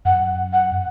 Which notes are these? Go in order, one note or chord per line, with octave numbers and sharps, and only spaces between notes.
F#2 F#5
F#5